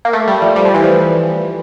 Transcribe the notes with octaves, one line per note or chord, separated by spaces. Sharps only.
A#3
A3
G3
F3
G3
F3
E3
F3